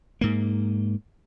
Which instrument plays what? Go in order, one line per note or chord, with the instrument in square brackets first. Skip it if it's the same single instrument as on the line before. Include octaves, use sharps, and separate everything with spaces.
[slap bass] G#2 A#3